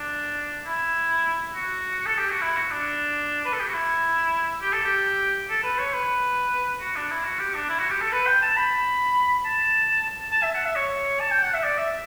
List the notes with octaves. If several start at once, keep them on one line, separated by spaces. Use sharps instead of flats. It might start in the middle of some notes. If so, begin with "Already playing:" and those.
Already playing: D4
E4
F#4
A4
G4
F#4
E4
F#4
D4
B4
A4
G4
F#4
E4
G4
A4
G4
A4
B4
C#5
B4
F#4
D4
E4
F#4
G4
D4
E4
F#4
G4
A4
B4
G5
A5
B5
A5
A5
E5
F#5
E5
C#5
A5
G5
F#5
E5
D5
E5